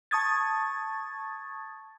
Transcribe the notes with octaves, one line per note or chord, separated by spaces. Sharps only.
A5 C#6 D#6 G#6 A6